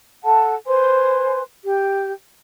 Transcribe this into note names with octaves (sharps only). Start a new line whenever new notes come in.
A4 F#5 A5
B4 C5 G#5 C6
G4